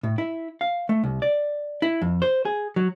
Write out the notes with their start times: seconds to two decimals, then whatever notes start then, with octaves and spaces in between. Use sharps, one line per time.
0.03 A2
0.18 E4
0.61 F5
0.89 A3
1.04 C2
1.22 D5
1.82 E4
2.02 F2
2.22 C5
2.45 G#4
2.76 F#3